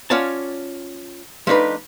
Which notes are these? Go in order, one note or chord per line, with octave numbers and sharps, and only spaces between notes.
C#4 F4 C#5 D5 F#5 A5
F3 A3 D4 D#4 B4